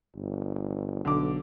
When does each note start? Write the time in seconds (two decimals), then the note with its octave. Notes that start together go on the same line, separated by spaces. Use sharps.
0.15 G1
1.05 B1 D3 D6